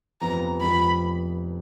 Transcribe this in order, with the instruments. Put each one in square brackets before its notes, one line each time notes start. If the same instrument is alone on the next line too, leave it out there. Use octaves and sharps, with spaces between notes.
[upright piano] F1 F2 F3 B3 [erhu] A#5
[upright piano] F1 F2 F3 B3 [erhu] B5